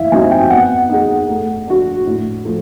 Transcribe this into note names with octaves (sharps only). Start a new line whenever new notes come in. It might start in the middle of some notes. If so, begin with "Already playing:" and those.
Already playing: E3 E5 F5
G3 C4 D#4 F#4 G#5
G5
B3 F#5
D#4 G#4
A3
D4 F#4
A2
F3 A3